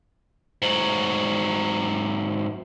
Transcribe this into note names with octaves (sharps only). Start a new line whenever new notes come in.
G#2 F#3